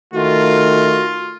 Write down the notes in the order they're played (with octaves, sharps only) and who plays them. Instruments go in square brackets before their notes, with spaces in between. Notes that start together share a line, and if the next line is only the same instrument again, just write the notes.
[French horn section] D#3 A3 [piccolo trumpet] F4 [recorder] F#4